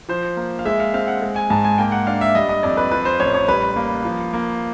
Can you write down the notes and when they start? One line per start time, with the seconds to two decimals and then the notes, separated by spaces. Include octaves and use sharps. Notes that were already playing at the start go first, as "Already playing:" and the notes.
0.09 F3 C5
0.37 A#3
0.59 F5
0.65 G#3 E5
0.80 F5
0.94 C4 F5
1.08 F#5
1.22 G#3
1.36 G#5
1.50 G#2 A5
1.65 G#5
1.78 A#3 G5
1.92 F#5
2.07 D4 F5
2.21 E5
2.35 G3 D#5
2.49 D#5
2.63 F2 D5
2.77 B4
2.91 F3 B4
3.05 C5
3.20 A1 C#5
3.34 C#5
3.48 G3 B4
3.76 A#3
4.05 F3
4.33 A#3